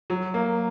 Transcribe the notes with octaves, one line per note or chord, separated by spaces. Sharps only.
F#3
A#3